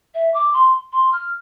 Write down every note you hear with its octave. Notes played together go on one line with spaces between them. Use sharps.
E5
D6
C6
C6
F6